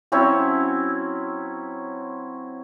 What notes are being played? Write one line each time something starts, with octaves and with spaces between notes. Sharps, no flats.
F#3 C4 C#4 E4